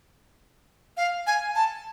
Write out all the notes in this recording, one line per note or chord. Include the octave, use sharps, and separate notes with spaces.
F5
G#5
A5